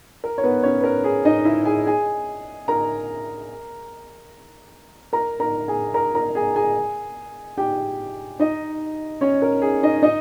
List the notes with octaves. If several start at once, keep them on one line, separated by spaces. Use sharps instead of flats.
A#4
C#5
B3 B4
C#4 C#5
B4
A#4
G#4
D#4 D#5
E4 E5
G#4 G#5
G#4 G#5
A#4 A#5
A#4 A#5
A#4 A#5
G#4 G#5
A#4 A#5
A#4 A#5
G#4 G#5
G#4 G#5
G4 G5
D#4 D#5
C#4 C#5
A#4
G#4
D#4 D#5
D#4 D#5